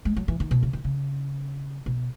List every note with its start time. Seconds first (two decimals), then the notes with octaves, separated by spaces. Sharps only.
0.05 G#3
0.16 F#3
0.28 E3
0.40 D#3
0.51 B2
0.63 C#3
0.73 D#3
0.84 C#3
1.86 B2